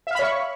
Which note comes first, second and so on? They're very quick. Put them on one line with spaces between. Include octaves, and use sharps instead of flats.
E5 F5 B5 C#5 C#6